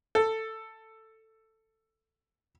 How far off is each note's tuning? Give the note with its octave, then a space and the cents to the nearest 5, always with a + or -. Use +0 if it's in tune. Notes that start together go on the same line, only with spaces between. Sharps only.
A4 +10